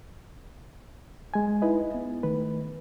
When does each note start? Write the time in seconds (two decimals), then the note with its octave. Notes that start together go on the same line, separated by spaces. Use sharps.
1.34 G#3 G#5
1.62 D#4 E4 B4 D#5
1.94 B3
2.23 D#3 A3 B4